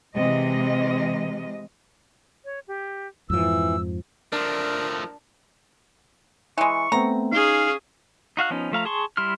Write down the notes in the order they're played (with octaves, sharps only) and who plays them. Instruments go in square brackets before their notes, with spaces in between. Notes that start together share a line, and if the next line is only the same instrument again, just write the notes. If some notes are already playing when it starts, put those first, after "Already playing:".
[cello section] C3 E3 G#3 D#5
[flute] C#5
G4
[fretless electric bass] F2 G#2 F3 [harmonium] E3 [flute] E6
[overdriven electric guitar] F3 A3 [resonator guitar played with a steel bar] D4 [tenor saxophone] A#4
[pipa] E3 G#3 [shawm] C#6
[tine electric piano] A3 B3 C4 [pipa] A#5
[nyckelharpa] C#4 G#4 [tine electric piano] D#4 [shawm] F5
[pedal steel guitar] D#4 F#4 F5 F#6
F3 B3 C#4 D#4
F3 A3 F5 A#5
G#4 A5 C6 C#6
G3 E4 C6 F6